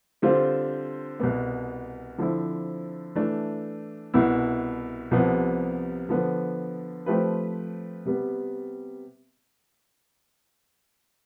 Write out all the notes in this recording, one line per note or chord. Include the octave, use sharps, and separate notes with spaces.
D3 G3 C4 F4 C5
C2 B2 B3
D3 F3 C4 E4
E3 A3 D4
C2 B2 B3 E4
C2 C3 F3 B3
D3 F3 B3
F3 A3 C4 G4 B4
C3 G3 B3